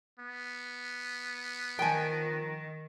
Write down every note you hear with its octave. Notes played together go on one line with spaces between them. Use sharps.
B3
D#3 F3 A#4 G5 G#5